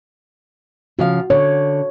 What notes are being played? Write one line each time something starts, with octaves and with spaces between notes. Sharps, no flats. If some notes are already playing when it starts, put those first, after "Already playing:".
C#3 F3 F#4 F5
D3 C#5